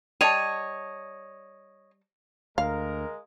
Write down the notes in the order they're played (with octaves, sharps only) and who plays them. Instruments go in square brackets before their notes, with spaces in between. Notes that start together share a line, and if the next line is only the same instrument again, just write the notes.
[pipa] G3 A5 [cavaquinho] C#5 D#5 [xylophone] D#7 F7
[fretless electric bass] D2 [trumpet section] G#3 A#4 [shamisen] F5